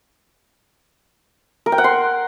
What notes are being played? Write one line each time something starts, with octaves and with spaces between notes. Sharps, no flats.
A#4
G5
F#5
C6